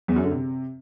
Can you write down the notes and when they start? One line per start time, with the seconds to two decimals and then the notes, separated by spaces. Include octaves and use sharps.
0.08 E2
0.16 F#2
0.24 D3
0.31 C3